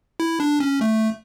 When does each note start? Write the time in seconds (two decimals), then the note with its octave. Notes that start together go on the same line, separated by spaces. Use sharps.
0.20 E4
0.40 D4
0.60 C#4
0.81 A3